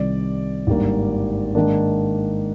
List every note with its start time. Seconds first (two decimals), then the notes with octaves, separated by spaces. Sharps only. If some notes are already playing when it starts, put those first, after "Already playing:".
Already playing: C2 C3 D#3 D5
0.67 G#1 G2 D3 G3 A#3
1.55 G#2 D#3 A#3 D4